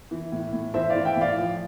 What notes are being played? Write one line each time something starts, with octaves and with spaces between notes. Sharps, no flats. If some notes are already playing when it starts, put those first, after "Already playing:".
E3
A2
A2
E3 C5 E5
D5 F5
E3
E5 G5
A2
D5 F5
F3